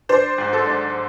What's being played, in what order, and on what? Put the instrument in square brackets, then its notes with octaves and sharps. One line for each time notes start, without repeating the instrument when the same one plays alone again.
[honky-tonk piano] D4 C5
G#2
A4
D4